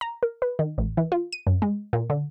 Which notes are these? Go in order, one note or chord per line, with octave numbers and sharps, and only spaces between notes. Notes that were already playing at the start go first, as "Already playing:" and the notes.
A#5
A#4
B4
D#3
A1
E3
F4
D#7
F#2
G#3
A#2
D3